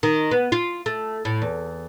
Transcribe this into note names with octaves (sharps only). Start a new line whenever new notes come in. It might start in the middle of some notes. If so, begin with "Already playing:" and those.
D#3
B3
F4
A3
A2
E2